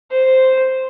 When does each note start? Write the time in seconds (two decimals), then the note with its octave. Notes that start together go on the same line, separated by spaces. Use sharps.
0.11 C5